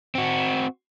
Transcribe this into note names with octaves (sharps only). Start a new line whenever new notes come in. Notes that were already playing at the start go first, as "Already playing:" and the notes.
C4 F#4